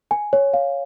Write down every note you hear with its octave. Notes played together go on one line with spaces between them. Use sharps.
G#5
C#5
F5